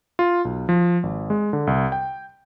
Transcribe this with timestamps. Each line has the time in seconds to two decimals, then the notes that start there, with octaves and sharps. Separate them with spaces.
0.19 F4
0.45 B1
0.69 F3
1.03 G#1
1.30 G#3
1.53 D3
1.67 C2
1.92 G5